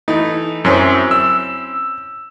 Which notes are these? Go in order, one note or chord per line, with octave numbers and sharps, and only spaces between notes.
E3 A3 D#4
F#2 C4 C#4 E4
E6